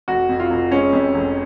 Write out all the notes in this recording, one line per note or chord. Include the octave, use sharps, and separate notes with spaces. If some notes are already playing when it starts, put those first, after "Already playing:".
F1 F#4
F2
F4
F1
G#3 C#4
F2
F1